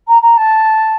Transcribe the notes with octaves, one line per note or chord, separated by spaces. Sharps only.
A#5
A#5
A5